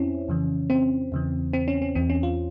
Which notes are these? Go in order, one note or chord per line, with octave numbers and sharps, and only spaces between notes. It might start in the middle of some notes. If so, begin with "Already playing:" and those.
Already playing: F2 C4 C#4 E4
F2 C#3 E3
C4
E2 C#3 E3
C4
C#4
C#4
E2 E3 C4
C#4
F4